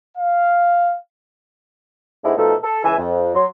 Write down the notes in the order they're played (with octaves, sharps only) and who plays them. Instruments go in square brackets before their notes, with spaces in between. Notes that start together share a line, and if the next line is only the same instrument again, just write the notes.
[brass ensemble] F5
[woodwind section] G#2 G#3 A3 B3 D4 E4
B2 F3 A3 D#4 A4
A4
C#2 E3 E5 G#5
F2
F#3 C6